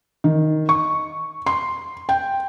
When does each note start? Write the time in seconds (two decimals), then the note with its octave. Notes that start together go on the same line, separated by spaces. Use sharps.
0.24 D#3
0.69 C#6
1.46 C6
2.09 G5